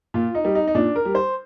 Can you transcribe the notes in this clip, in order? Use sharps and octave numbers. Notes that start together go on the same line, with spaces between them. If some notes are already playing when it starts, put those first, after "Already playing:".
A#2 F4
D#4
G3
D#4
D#4
A#2 D4
A#4
G3
C5